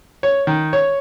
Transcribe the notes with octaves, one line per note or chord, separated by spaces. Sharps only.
C#5
D#3
C#5